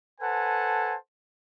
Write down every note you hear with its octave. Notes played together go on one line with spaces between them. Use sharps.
A4 B4 C5 F#5 G#5 A5